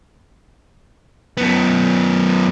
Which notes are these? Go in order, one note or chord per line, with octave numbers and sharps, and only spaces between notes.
F#2 B3